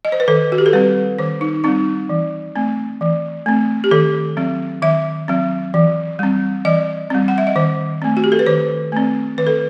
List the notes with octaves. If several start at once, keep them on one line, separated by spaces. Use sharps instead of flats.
D#5
C5
B4
D#3 A4
F#4
G4
A4
G3 C4 B4
D#3 C5
D#4
G3 C4 D#4
E3
A3 C4
E3
A3 C4
G4
D#3 A4
F#3 C4
D#3 E5
F#3 C4
E3
G3 C4
E3 D#5
G3 C4
F#5
E5
D#5
D#3 C5
A3 C4
F#4
G4
A4
B4
D#3 C5
A3 C4
D#3 B4
A4